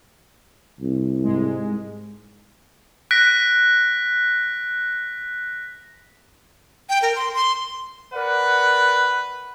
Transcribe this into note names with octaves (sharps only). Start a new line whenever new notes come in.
C2
G#2 G#3
F#6 A#6 B6 D7
G5
A#4
C6
C6
A#4 B4 D5 F#5